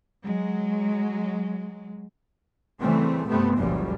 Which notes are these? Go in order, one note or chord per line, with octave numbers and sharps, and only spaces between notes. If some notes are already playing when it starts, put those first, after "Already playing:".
F#3 G#3
C#3 E3 G3 A3 C4
G2 C3 A3 B3 C4
F#1 C#2 F#2 A#2 F3 G3